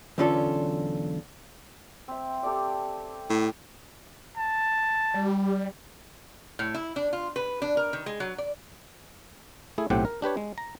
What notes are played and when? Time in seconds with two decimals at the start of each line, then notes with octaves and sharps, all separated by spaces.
0.18 B1 E2 D3 C#4 F4 A4
2.08 C4 E5
2.43 G4 A4 D5
3.30 A2
4.37 A5
5.14 G3
6.59 A2
6.74 E4
6.96 D4
7.13 F4
7.36 B4
7.62 D4
7.77 A#4
7.93 D#3
8.06 G#3
8.20 F#3
8.38 D5
9.78 A3 E4 G#4
9.90 B1 A2 C4 G4 F#5 G5
10.05 A#4
10.22 D4 G4 B4 C#5
10.37 G#3
10.58 A#5